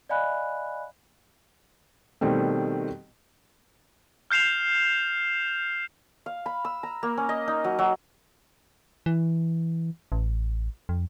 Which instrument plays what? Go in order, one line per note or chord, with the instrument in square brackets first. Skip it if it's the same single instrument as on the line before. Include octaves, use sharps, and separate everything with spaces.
[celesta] D5 D#5 F5 G#5 B5 F#6
[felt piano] B2 D#3 G3 A3 C4
[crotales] F6 G6 C7 E7 F7
[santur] F5
B5
E6
A#5
A#3
C#4
D#5
D#4
F#3
F#3
[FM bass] E3
A1
F2